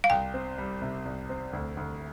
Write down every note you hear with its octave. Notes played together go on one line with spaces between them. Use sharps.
F5
C2 G5
C4
G3
C3
C2
C4
D2
D2